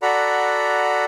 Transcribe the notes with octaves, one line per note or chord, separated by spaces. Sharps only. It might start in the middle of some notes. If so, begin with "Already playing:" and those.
F#4 A4 D5 F#5 A#5 B5